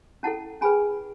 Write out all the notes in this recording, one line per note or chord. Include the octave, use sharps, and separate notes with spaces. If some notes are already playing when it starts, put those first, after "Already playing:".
C#4 E4 A4 F#5 A5
C#4 G#4 B4 G#5 B5